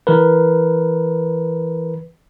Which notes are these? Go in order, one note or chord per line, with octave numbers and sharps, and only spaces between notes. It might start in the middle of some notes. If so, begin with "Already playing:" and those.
E3 A#4 B4